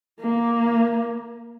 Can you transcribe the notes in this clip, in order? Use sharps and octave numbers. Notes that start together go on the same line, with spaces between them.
A#3